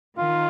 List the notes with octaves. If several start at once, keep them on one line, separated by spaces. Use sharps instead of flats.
D#3 F4